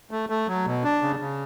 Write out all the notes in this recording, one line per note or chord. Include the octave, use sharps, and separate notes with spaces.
A3
A3
F#3
B2
D4
C#3
C#3